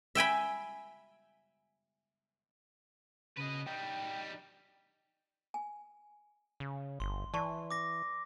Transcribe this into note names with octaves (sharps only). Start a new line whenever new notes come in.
E5 G5 G#5 B5
C#3 B4 D#5
G3 D#4 G5
G#5
C#3
G1 C6
E3 D5 A5 C#6
D6 A#6